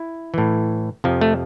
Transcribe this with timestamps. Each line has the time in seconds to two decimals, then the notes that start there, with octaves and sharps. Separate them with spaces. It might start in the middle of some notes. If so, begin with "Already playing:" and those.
Already playing: E4
0.34 A2 E3
1.04 F2 C3 F3
1.21 A3